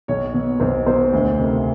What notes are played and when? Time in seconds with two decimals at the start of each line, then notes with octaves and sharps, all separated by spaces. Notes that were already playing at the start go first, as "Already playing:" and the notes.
0.08 B1 C#5
0.34 B2
0.60 B1 C5
0.87 B2 C5
1.13 D2
1.38 C3 D#3